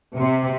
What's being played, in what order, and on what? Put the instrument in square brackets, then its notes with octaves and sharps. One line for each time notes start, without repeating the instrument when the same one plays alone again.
[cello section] C3